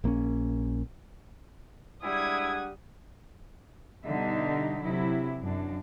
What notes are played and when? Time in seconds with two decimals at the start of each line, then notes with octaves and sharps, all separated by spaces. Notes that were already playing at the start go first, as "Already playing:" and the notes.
0.04 A#1 A#3 C4 C#4
2.03 G3 G#3 D4 E4 F#5 D#6 G#6
4.06 B2 D3 G3 D#4 E5
4.81 C3 F#3 E4
5.41 F#2 D4